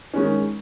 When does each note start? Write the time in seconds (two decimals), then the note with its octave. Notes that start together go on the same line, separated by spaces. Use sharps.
0.13 D#3 G#3 C#4